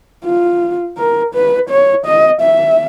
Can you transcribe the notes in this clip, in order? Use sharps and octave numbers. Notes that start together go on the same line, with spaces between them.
F4
A#4
B4
C#5
D#5
E5